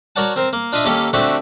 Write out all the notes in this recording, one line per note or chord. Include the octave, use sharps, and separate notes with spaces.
F#4 A#4 C#5 D5 F#5 A5
C4 A#4 C5
A#3
D4 F4 D#5 E5
D#2 A#3 C#4 G4 A4
D3 A3 C4 F#4 G4